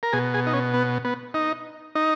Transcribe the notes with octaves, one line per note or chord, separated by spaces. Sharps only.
A#4
B2 G#4
G#4
D#4
C#4
B3
B3
D#4
D#4